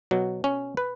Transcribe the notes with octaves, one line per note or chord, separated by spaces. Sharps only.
B2 F#3
C#4
B4